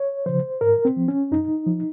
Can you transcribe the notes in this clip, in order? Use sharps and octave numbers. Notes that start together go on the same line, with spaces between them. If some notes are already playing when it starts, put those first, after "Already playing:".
Already playing: C#5
C#3 F3 C5
G#2 A#4
C4
F3
C#4
F#2 D#4
F3